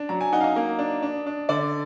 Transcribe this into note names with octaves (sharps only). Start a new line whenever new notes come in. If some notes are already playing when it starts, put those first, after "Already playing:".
Already playing: D4
F#3 A#5
G#5
D#4 F#5
F5
D#5
A#3
D4
D4
D4
D3 D5